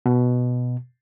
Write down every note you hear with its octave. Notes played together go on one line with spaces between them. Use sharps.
B2